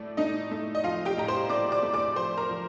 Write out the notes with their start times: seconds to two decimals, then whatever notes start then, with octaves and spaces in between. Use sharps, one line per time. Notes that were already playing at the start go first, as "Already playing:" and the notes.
Already playing: A2 A3 D5
0.17 A3 D#4 D#5
0.51 A3
0.75 D#5
0.84 F3 F4 F5
1.05 G4 G5
1.17 A2 A#5
1.28 C5 C6
1.50 A3 D5 D6
1.72 D5 D6
1.83 A3
1.94 D5 D6
2.16 F3 C5 C6
2.37 A#4 A#5
2.49 F3